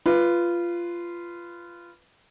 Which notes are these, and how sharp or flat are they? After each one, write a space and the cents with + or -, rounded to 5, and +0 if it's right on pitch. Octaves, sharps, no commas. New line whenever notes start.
F4 -15 B4 +0